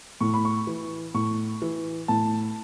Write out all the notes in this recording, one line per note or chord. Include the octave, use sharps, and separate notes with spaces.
A2 C#6
B5
C#6
E3
A2 C#6
E3
A2 A5